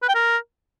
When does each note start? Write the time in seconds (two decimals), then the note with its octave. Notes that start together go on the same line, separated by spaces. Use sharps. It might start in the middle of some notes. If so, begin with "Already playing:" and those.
0.02 B4
0.09 G5
0.15 A#4